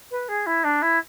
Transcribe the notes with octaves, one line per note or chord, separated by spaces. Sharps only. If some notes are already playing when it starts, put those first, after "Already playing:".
B4
G#4
E4
D4
E4